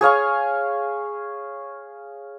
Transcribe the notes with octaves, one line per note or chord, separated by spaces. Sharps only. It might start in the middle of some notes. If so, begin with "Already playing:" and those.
G#4 C#5 F5 C#6